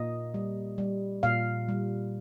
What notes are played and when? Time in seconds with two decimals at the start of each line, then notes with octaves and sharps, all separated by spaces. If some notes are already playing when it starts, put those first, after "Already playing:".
Already playing: A#2 A#3 D#5
0.34 G3
0.78 G3
1.23 A#2 F5
1.68 G3